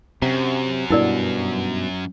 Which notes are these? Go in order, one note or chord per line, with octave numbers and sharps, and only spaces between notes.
F#2 C3 A#5
G2 B2 E4 A#4 D5